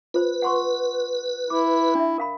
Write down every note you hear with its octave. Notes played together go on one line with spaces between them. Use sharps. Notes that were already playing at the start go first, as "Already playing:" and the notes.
F4 B4 C5
F#5 C6 C#6
E4 D6
D4 E5
A#4 F5 B5